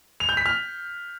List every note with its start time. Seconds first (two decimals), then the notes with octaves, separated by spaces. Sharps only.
0.20 F7
0.29 G6
0.37 B6
0.46 F6